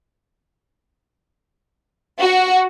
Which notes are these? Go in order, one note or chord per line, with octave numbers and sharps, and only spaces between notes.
F#4